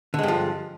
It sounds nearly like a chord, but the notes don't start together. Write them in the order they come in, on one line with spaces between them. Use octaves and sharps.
D3 G#3 G2 F3